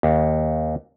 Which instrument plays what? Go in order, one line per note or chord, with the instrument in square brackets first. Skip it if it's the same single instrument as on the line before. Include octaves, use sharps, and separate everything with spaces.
[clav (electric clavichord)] D#2